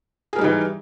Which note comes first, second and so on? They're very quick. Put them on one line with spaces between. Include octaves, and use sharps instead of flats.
G#4 A#4 G3 D#4 E3